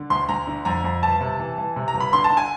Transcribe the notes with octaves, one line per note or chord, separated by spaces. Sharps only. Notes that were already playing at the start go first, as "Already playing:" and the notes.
Already playing: D3
D2 C6
D2 A#5
D3
F2 A#5
F2
G1 A5
C3
E3
E3
C3
A#5
G1
B5
D3 C6
A5
D3
G#5